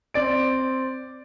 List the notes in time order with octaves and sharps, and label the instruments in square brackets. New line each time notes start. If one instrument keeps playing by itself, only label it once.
[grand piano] C4 D5 D7